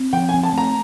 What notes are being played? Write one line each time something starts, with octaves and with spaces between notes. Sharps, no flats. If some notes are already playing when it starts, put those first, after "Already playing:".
Already playing: C4
F3 G5
G#5
C4
A5
A3 A#5